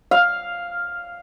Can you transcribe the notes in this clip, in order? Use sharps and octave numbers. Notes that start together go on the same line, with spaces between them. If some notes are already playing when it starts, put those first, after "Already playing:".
F5